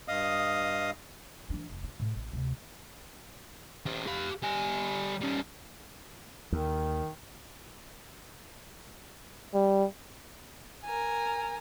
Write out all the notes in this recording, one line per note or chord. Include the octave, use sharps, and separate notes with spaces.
G2 D#5 F5 D#6
E3 D4
F1
F4
A2
A1
D2 C3
C#4 G4
G4 F5
G3 G#5
G3 C#4
D#2 D#3
G3
A#4 G#5